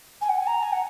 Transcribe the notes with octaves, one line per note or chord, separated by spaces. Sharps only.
G#5
F#5
G#5
A#5
G#5
F#5